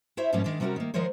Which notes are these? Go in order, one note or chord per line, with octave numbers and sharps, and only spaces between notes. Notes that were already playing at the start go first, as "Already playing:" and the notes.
E4 C5 C#5 E5
G#2 B2 F3 G3 A#3 C#4
D#3 G#3 D4
C3 G3 C#4 F4 F#4 A#4
D#3 A#3
D#3 F3 G#3 A#4 C5 C#5